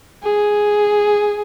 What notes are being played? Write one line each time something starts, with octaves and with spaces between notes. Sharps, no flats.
G#4